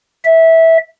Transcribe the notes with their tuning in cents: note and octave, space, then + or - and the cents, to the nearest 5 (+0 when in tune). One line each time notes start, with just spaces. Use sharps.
E5 -15